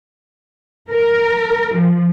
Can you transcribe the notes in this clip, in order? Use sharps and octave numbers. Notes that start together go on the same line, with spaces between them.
A#4
F3